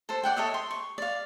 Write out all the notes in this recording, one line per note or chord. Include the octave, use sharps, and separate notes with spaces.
A4 C5
D5 F#5 G5
A4 C#5 D#5 E5
C6
C#6
D5 F5